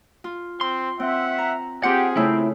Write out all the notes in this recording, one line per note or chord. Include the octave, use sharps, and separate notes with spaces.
F4
C4 C6
C4 E5 F#5
A#5
C4 F4 G4 G#4 F#5
C#3 A3 C4 E4